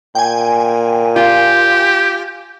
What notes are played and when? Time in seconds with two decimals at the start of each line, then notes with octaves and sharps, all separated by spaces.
0.15 A#2 G5 G#5
1.16 F4 G4